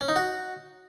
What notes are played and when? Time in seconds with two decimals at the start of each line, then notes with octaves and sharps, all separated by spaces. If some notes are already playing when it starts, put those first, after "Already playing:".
0.01 C#4
0.08 D#4
0.16 F#4